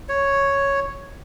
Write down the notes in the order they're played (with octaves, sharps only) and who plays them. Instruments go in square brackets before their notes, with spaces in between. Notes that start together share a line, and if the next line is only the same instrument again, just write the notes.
[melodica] C#5